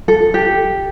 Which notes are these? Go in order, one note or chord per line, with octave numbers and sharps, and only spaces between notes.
A4
G4